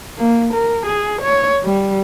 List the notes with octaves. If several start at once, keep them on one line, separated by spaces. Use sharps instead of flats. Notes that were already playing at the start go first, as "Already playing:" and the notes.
A#3
A#4
G#4
C#5
G3